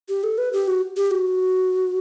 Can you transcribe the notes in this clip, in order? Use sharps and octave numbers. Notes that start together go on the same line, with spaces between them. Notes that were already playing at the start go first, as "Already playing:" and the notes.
G4
A4
B4
G4
F#4
G4
F#4